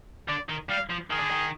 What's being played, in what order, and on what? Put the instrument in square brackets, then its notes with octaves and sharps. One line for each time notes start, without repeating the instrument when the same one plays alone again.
[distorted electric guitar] D3 [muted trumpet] D5
[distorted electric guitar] D#3
[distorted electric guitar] G3 [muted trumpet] F5
[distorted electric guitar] F3
[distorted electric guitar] D#3 [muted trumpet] G#4
[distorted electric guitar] D3
D#3